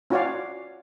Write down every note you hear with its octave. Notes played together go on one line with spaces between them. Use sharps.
C#4 F4 F#4 C#5 D5 F5